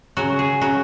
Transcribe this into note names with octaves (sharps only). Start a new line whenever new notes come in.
C#3 F#3 F#4
G#4
C#3 F#3 F#4